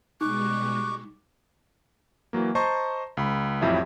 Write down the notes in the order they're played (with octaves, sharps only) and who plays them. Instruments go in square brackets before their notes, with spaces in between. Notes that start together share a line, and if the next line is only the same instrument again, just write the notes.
[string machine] B2 G3 G#3 [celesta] D#4 [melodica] C#6 D6 [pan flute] F#6
[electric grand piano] E3 F#3 A#3
C5 D#5 A5 A#5 C6 C#6
C#2 B5
A1 F2 F#3 E4 G4 E5